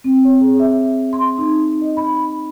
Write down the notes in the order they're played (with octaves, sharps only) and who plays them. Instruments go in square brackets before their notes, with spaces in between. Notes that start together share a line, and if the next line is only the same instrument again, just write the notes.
[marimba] C4
C#5
G#4
E5
C6
D#4
D#5
B5